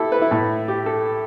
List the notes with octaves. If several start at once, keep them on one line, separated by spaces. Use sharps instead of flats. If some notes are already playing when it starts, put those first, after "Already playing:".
Already playing: E4 G4 A4
B4
E4
A2 A3
G4
A4